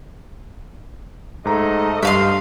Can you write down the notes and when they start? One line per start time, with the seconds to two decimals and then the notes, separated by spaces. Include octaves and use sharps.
1.45 G#2 A3 D#5 A#5
2.03 G2 E5 F5 C6